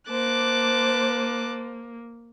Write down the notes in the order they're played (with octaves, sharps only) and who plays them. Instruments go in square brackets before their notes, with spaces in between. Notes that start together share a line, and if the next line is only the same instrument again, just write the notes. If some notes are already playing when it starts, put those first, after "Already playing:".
[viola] A#3 [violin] C5 [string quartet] A5 D6 F#6